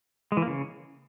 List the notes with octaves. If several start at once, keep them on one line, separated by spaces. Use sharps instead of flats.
G#3
E3
A#3
C#3